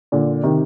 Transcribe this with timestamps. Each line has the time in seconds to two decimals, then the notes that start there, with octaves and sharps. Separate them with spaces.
0.12 A#2 D3
0.43 C3 D#3